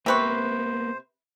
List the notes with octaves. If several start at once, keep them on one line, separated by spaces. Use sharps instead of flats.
C3 A#3 B3 B4 C5 C#6